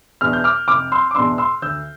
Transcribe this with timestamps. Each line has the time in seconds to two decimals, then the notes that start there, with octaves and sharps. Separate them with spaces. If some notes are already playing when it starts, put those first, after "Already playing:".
0.21 E2 B2 B3 D4 F6
0.33 G6
0.44 D6 F6
0.68 F1 D6 F6
0.92 C6 E6
1.11 D6
1.15 E2 B2 B3 D4 C6 E6
1.38 C6 E6
1.62 D2 E6 G6